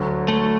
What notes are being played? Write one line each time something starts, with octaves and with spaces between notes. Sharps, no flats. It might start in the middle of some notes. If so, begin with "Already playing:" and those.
Already playing: D2 D3 F#3
A3